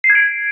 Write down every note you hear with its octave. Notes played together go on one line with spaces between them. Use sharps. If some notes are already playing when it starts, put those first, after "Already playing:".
C7
G#6
D7